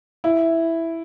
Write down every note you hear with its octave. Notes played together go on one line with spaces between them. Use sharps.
E4